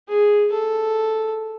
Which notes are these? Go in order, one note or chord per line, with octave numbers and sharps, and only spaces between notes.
G#4
A4